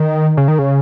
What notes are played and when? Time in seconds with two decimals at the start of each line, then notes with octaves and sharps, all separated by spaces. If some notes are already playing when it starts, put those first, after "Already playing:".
Already playing: D#3
0.37 C#3
0.48 D#3
0.59 C#3